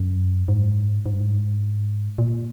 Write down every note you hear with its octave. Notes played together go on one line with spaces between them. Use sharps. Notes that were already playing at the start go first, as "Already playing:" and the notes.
Already playing: F#2
G#2
G#2
G2
G#2
A#2